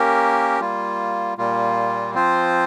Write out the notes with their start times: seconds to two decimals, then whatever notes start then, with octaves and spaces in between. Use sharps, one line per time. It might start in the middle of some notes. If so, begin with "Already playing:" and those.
Already playing: A#3 C#4 G4 A#4
0.60 G3 A#3 F4
1.38 A#2 G3 A#3 F4
2.14 F3 C4 F4 C5